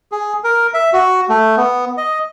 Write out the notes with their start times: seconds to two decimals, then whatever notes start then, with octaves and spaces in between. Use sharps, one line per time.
0.12 G#4
0.44 A#4
0.74 E5
0.93 F#4
1.29 A3
1.57 B3
1.97 D#5